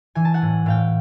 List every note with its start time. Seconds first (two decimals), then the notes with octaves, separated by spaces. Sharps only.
0.15 E3 G#5
0.25 A5
0.34 F#5 G#5
0.42 A2
0.66 A2 F5 G5